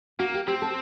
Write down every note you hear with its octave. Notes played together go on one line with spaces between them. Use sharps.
A#3 F#4
G4
C4 G4
A4